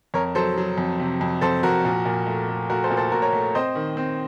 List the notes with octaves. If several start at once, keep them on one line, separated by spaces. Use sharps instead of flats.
F2 A#4 C#5
F#3 A4 C5
F#3
F2
C3
F2
F2 A4 C5
F2 F#4 A#4
A#2
A#2
A3
A3
A3 F#4 A#4
A4 C5
A#2
A4 C5
A#2 F#4 A#4
A#4 C#5
A3
C4 C5 D#5
D#3
C4